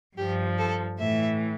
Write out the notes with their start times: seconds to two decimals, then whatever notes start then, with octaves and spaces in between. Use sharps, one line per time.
0.17 G2 F3 G4
0.58 A4
0.99 A2 E3 E5